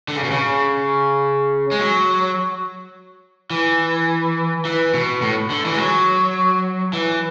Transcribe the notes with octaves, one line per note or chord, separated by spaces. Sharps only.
D3
C#3
B2
C#3
G#3
F#3
E3
E3
B2
A2
D3
E3
G#3
F#3
E3